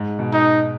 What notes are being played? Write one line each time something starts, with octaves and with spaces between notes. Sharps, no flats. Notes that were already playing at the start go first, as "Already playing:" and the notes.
Already playing: G#2
B2
D#4